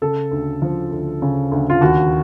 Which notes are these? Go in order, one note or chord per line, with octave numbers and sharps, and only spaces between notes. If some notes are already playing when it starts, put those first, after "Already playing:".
C#3 A4
D2
F3
D2
C#3
D2
F4
D#2 F#4